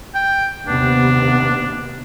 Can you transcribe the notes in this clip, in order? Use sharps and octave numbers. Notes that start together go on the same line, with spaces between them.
G5
D#2 C3 B3 D4